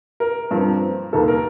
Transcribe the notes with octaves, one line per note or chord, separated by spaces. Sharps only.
A#4
G2 F3 C4
D#2 D#3 A#3 A4
A#4